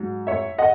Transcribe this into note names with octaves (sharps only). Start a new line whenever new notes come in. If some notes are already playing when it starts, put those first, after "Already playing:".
Already playing: G#2 F#3
C#5 E5
D#5 F#5